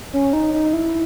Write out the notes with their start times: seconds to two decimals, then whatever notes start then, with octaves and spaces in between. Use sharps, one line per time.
0.13 C#4
0.33 D#4
0.54 D#4
0.73 E4